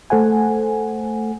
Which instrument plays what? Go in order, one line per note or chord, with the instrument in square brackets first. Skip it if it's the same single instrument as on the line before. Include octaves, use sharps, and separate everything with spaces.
[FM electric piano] A3 A4 C5 F#5 G#5